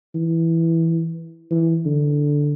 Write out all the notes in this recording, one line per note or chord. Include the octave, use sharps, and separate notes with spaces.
E3
E3
D3